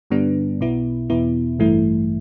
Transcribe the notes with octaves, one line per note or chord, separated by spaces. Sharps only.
G2 D3 G3 B3 D4
B1 B2 B3 E4
E2 B2 B3 E4
A1 G2 E3 A3 E4